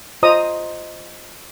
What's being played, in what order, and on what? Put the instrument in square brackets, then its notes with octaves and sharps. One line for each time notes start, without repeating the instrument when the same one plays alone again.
[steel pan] F4 C5 D#5 A#5 D#6